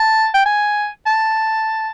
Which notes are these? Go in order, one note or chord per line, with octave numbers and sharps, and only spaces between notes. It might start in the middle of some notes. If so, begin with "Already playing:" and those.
Already playing: A5
G5
G#5
A5